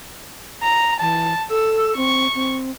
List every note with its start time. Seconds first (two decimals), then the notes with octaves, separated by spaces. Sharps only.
0.63 A#5
1.01 E3 A5
1.50 A4 E6
1.97 C4 C#6
2.35 C4